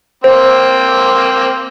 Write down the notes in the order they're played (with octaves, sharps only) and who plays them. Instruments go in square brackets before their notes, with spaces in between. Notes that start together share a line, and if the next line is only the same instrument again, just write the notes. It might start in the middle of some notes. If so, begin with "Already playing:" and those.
[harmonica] A#3 C4 [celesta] C5